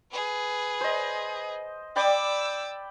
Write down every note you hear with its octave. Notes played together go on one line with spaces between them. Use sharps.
G#4 B4
C5 D#5
D5 G5 B5 D6 E6